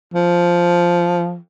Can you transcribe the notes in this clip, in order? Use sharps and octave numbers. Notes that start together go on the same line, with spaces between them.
F3